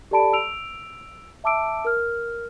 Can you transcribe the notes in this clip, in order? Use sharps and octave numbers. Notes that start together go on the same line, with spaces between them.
G4 A4 D5 A5 B5 D7
E6 D7 F7
E5 A5 D6 E6 D7
A#4 F6